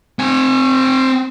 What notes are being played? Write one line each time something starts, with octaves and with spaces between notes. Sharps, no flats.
C4 G#5